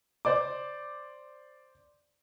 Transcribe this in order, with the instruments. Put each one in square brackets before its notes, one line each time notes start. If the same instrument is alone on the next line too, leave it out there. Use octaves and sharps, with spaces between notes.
[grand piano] C5 D5 D6